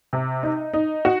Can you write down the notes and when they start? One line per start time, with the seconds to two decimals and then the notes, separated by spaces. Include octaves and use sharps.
0.13 C3
0.43 D#4
0.73 D#4
1.05 F#4